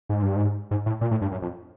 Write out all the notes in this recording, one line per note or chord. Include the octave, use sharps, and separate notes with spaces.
G#2
G2
G#2
G#2
A2
A#2
A2
G2
F#2
F2